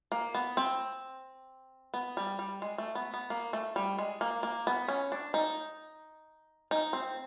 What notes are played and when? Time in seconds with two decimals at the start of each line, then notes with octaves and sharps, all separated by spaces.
0.12 A#3
0.34 B3
0.57 C4
1.94 B3
2.17 G3
2.39 G3
2.62 G#3
2.78 A3
2.95 B3
3.14 B3
3.30 A#3
3.53 A3
3.76 G3
3.98 G#3
4.21 A#3
4.43 A#3
4.67 B3
4.88 C#4
5.12 D4
5.34 D#4
6.71 D#4
6.93 C4